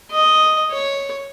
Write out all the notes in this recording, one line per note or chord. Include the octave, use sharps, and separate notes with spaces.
D#5
C#5